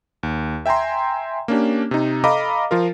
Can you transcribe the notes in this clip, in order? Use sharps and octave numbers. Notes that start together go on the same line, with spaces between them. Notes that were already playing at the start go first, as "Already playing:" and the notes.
D#2
E5 G5 G#5 A#5 C6
A#3 C#4 D4 G4
C3 D#4
A4 D#5 F5 A#5 B5 D6
F3 F4 A#4